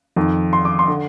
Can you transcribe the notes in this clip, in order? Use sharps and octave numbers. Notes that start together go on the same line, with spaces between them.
F2 D#3
C6
D6
C6
D3